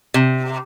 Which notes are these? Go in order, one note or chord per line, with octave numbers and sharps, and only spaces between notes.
C3